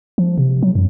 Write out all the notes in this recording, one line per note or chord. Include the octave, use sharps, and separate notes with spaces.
F3
C3
F#3
F#2